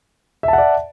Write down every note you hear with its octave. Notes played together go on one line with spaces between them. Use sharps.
D5 E5 F#5 A5